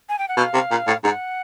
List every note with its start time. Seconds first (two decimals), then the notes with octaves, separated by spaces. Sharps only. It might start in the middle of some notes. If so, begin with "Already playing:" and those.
0.09 G#5
0.19 G5
0.28 F#5
0.37 B2 F5
0.54 C3
0.71 A#2
0.87 A2
1.04 G#2 F#5